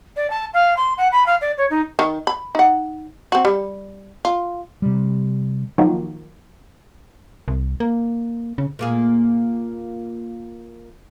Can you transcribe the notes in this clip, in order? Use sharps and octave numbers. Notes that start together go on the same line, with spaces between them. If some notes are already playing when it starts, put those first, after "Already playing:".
D5
A5
F5
C6
F#5
B5
F5
D5
C#5
D#4
D#3
B5
D#4 F#5
C4 F#4
G3
F4
C3 G3
D#3 F3 F#3 A#3
C2
A#3
C#3
A#2 A#3 G#4